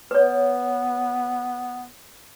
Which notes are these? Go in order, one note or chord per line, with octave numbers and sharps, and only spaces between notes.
B3 B4 C#5